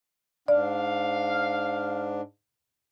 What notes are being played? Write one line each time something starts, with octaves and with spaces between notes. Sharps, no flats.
G#2 D4 D5 F5